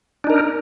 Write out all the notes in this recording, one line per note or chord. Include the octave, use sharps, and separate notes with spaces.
D4 D#4 A#4